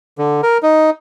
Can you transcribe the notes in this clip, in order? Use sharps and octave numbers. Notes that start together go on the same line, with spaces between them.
D3
A#4
D#4